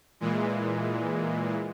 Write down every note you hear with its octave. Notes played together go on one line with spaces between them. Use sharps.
A#2 E3 G#3